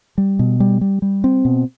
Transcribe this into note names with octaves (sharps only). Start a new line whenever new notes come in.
G3
B2
G3
G3
G3
C4
B2